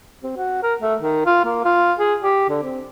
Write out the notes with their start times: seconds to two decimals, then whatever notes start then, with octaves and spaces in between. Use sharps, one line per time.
0.23 C4
0.37 F#4
0.63 A#4
0.81 A3
1.01 D#3
1.26 F4
1.45 A#3
1.64 F4
1.99 G#4
2.23 G4
2.49 D3
2.63 C4